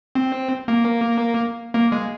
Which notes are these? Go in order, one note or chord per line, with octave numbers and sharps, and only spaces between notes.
C4
A#3
A#3
G#3